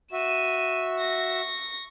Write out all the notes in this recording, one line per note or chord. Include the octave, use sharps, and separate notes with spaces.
F#4 E5 D#7 E7
C#6 A#6